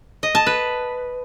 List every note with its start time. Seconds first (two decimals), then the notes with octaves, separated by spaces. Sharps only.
0.23 D#5
0.35 A5
0.47 B4